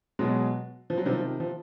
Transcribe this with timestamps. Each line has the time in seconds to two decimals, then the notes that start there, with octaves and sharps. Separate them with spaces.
0.19 B2 F#3 G#3
0.90 F3
0.98 F#3
1.05 C3 D#3 F3 G3
1.40 F3